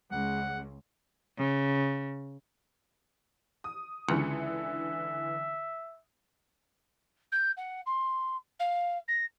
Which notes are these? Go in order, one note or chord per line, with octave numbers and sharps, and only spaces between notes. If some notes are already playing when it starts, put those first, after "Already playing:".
C#2 F#5
C#3
D#6
C#2 D3 E3 C#7
E5
G6
F#5
C6
F5
A#6